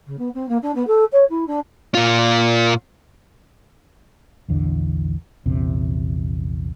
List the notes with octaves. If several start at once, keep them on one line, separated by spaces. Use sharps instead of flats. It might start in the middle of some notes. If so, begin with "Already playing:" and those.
C#3
B3
C4
A#3
D4
B3
A4
C#5
E4
D4
A#2 F4
A#1 E2 D3
A#1 E2 C3